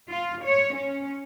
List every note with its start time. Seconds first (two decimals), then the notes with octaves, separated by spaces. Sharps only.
0.11 F4
0.45 C#5
0.77 C#4